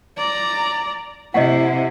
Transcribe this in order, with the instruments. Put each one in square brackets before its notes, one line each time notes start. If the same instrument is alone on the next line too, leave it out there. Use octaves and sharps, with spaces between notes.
[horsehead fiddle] D5 A#5
[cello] C3 [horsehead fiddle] E4 [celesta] D#5 F#5